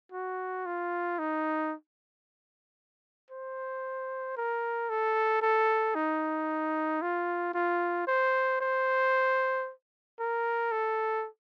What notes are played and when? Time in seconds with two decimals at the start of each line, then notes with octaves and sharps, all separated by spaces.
0.12 F#4
0.66 F4
1.19 D#4
3.31 C5
4.37 A#4
4.90 A4
5.42 A4
5.95 D#4
7.02 F4
7.54 F4
8.07 C5
8.61 C5
10.19 A#4
10.72 A4